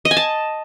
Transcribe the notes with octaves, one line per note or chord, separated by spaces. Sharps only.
D#5
G#5
A5